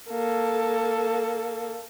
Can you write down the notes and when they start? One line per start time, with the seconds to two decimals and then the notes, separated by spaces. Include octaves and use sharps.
0.10 A#3 A4